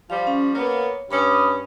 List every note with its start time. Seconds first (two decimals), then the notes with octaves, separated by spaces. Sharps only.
0.10 F3 G3 F5
0.27 C#4
0.55 A#3 B3 C#5
1.11 G2 C#4 B5 D6 D#6